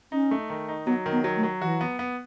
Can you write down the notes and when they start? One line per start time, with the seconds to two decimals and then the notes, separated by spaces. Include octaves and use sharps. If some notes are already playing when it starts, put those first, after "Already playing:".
0.12 C#4 D#4
0.31 A3
0.50 D#3
0.68 D#4
0.86 F#3 B3
1.06 D#3
1.12 B3
1.24 F#3
1.37 A3
1.43 F#3
1.61 E3 F#4
1.81 B3
1.99 B3